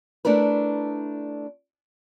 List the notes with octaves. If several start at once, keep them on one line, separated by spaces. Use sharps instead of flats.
A3 D4 E4 A#4 B4